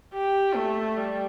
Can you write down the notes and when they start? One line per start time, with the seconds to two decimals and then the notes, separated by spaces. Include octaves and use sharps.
0.14 G4
0.55 A3
0.97 G3